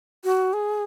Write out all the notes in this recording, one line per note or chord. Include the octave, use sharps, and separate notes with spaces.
F#4
G#4